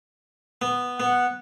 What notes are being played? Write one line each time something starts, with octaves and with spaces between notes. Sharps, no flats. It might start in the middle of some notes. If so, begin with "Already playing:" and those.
B3
B3 F#5